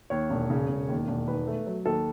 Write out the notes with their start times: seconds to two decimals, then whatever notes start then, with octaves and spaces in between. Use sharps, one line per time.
0.10 D#2 C#5
0.30 E1
0.50 C#3
0.69 E1
0.89 D#2
1.08 E1
1.27 D#3 B4
1.47 A3
1.67 F#3
1.86 D#2 A4